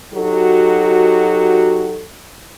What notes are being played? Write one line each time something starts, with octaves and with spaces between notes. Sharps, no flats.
F#3 D#4 F#4 G4 A4